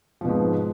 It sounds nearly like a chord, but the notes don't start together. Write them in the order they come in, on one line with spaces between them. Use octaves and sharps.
F3 B2 G#2